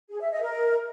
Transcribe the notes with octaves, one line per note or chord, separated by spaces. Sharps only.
G#4
E5
D#5
A#4